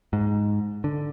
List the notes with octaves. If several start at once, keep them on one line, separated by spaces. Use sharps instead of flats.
G#2
D3